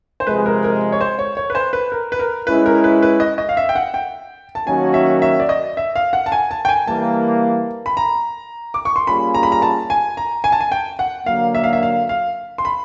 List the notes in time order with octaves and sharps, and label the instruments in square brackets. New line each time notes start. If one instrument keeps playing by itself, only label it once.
[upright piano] C5
[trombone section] C3 F3 G#3 [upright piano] B4
[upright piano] A#4
A#4
C#5
C5
C#5
C#5
B4
C5
B4
A#4
B4
A#4
[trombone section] G#3 C#4 E4 [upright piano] B4
[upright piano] A#4
B4
B4
D#5
D#5
F5
E5
G5
F#5
G5
A5
[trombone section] D#3 F#3 A#3 C#4 F#4 [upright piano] G#5
[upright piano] E5
E5
D5
D#5
E5
F5
F#5
A5
G#5
A5
G5
G#5
[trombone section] E3 G3 A#3 [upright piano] A5
[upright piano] B5
A#5
D6
C#6
C6
[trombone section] G3 A#3 C#4 F4 G#4 [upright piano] B5
[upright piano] A#5
B5
A#5
A5
G#5
A#5
G#5
A5
G#5
G5
F#5
[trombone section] D3 F#3 A#3 [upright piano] F5
[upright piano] E5
F5
E5
F5
F5
C6
B5